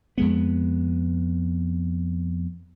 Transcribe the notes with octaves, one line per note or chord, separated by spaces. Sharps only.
F2 G#3 B3